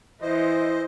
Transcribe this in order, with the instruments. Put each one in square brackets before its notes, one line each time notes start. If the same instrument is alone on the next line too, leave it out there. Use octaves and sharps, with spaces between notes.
[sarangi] E3 [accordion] C5 D#5